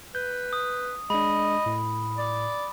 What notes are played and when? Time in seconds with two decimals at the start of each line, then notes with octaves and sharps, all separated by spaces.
0.15 B4 G6
0.53 D#6
1.10 G#3 D4 D#5 B5
1.66 A2
2.18 D5